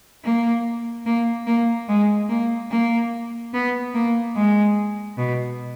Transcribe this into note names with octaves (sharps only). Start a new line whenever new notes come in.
A#3
A#3
A#3
G#3
A#3
A#3
B3
A#3
G#3
B2